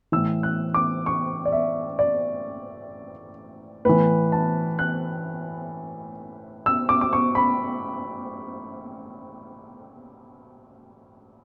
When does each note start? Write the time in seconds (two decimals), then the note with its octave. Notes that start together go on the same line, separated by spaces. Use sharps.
0.12 A2 E3 E6
0.43 F#6
0.74 D6
1.06 C#6
1.45 D5
1.52 E5
1.99 D5
3.85 A2 E3 B4
4.32 A5
4.79 F#6
6.66 E6
6.89 D6
7.01 D6
7.13 C#6
7.35 B5